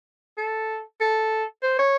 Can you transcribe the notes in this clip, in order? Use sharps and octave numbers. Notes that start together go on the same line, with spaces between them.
A4
A4
C5
C#5